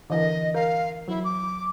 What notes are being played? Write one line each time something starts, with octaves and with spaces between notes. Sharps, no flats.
D3 E3 A#4 D#5
A#4 F5
F#3 E4
D6